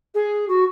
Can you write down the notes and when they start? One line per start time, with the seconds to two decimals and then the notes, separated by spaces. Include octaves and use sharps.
0.14 G#4
0.48 F#4